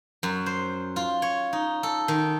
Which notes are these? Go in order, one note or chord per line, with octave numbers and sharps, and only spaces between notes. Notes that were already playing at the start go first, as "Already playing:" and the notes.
F#2
C5
F4
C#5
D#4
A4
D#3